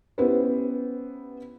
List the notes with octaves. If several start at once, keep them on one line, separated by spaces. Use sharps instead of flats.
B3 C#4 E4 G4 B4 C5